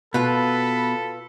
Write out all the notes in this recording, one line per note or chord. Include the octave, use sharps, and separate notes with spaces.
B2 F4 A4 B4 B5